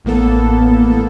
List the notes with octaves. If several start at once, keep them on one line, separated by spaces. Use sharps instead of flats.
A1 A2 A#3 B3 A4